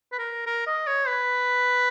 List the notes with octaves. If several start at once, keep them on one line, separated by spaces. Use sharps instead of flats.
B4
A#4
A#4
D#5
C#5
B4